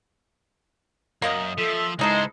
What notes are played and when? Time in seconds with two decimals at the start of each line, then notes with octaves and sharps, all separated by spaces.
1.22 F#2 A#3 A#4 D#5
1.58 F3 A4 E5
1.99 C#2 E3 G#3 D#4 A4 C5